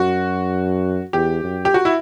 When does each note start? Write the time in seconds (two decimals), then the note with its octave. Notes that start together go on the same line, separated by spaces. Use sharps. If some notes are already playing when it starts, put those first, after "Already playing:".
Already playing: F#2 F#4
1.13 E2 G4
1.44 F#2
1.65 G4
1.74 F#4
1.85 E4